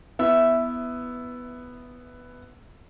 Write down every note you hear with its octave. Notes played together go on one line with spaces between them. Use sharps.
B3 E4 E5 E6